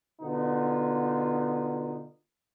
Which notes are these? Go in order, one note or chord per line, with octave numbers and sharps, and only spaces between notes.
B2 D3 B3 D#4 F4